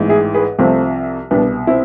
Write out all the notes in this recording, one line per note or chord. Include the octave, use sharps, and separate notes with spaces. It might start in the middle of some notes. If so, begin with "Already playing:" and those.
Already playing: A1 G#2 E3
E4 G#4
G#4 B4
C2 C3 F3 A3 C4
C2 B2 B3 D4
C4 E4